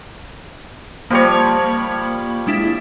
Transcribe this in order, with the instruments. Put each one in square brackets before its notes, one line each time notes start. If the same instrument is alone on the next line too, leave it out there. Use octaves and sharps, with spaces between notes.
[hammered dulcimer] F3 G3 C#5 [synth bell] A#3 B5
[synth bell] G#3 D4 E4